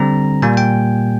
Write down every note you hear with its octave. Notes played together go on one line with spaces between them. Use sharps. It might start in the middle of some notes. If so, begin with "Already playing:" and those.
Already playing: D3 G3 C4 A#5
A#2 G3 A#3 G#5
G5